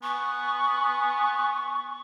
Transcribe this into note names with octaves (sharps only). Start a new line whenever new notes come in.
B3 G#5 C#6